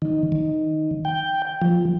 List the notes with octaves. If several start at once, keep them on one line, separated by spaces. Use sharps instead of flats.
D#3
D#3
G5
F3